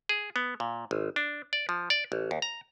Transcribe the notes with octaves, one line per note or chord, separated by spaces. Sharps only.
G#4
B3
A#2
G#1
D4
D5
F3
D5
A1
D#2
A#5